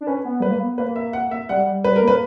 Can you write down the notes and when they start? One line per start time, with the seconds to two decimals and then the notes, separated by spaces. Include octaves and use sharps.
0.01 D4
0.07 C#4 B4
0.25 B3
0.40 G3 B4
0.50 A#3
0.60 B3
0.78 A#3 B4
0.96 E5
1.13 F#5
1.31 E5
1.49 G3 F#5
1.66 G3
1.84 G3 B4
1.96 A#4
2.02 A#3
2.07 B4